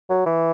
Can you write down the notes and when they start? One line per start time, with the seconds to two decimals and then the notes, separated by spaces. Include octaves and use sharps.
0.10 F#3
0.26 E3